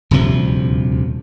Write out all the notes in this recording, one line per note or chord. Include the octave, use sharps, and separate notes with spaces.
D#1 D2 C3 F3